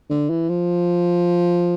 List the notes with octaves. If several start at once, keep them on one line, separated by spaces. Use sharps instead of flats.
D3
E3
F3